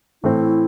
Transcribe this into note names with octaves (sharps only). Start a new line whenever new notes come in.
A2 E3 A3 C4 E4